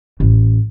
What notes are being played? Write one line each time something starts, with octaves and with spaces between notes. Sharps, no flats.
A1